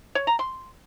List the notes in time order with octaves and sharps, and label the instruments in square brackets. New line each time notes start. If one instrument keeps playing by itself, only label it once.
[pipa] C#5
A#5
C6